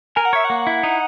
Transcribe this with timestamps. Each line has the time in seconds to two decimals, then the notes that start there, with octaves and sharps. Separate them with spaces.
0.16 A#4 G#5
0.25 F#5
0.33 C#5 E5
0.45 F#5
0.50 A#3
0.67 E4
0.83 D#4